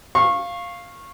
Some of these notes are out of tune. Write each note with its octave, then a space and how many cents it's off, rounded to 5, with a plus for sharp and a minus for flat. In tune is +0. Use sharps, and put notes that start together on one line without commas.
F5 +0 C#6 -20